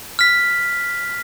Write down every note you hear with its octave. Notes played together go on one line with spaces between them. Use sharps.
F6 B6